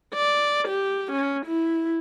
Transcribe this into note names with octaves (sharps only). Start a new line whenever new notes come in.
D5
G4
C#4
E4